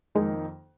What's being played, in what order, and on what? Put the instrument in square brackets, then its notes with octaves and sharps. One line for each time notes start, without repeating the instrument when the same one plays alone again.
[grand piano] F2 D#3 A#3 D#4 [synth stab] G#3